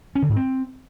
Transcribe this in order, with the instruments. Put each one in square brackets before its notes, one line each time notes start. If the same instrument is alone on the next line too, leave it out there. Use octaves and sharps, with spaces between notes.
[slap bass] C#4
D3
G#2
C4